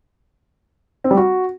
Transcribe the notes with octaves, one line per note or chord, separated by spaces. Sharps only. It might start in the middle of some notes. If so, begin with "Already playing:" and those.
C4
G3
F#4